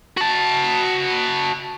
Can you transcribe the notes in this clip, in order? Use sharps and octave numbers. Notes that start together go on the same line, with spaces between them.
F#4 A5